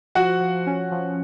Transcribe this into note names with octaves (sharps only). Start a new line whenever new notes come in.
F3 F#4 F#5
F3
C#4
F3